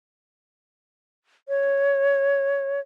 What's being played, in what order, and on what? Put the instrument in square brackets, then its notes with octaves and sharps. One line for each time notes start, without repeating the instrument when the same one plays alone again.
[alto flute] C#5